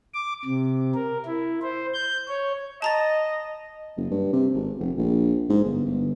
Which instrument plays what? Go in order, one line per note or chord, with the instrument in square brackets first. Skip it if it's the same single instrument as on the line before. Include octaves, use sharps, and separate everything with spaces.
[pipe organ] D6
C3
A#4
E4
C5
G6
C#5
[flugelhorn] D#5 [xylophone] A5 A#5 A6
[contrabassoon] F#1
G2
C3
G#1
F1
A#1
G#2
G1
G1